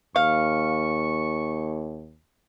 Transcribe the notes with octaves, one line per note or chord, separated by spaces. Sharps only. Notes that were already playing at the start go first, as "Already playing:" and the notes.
D#2 F5 C#6